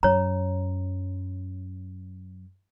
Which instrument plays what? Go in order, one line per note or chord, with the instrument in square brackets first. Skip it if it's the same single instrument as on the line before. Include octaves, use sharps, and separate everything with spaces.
[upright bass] F#2 [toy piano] C#5 A#5